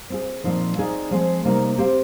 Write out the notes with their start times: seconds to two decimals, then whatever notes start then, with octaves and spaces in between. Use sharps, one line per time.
0.10 C4 F4 G#4
0.44 A#2 F3 C4 D#4
0.77 C4 D#4 G#4 D5 F5
1.11 F3 G#3 C4
1.45 C3 G3 A#3 D#4
1.78 C4 G4 C5 F5